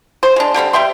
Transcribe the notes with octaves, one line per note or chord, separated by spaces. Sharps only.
C5
G#3 D4
D3 G3 B3 C4
G3 E5 G5 C6